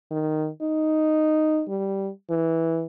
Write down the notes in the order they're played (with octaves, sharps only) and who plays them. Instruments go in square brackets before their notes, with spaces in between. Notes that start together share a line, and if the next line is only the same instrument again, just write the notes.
[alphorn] D#3
D#4
G3
E3